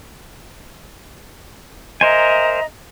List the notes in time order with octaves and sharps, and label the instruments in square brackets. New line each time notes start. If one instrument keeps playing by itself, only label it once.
[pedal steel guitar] A#4 C5 G#5 [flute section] D#5 E5 A#5